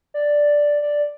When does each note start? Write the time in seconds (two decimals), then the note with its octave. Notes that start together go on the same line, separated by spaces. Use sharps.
0.14 D5
0.82 D5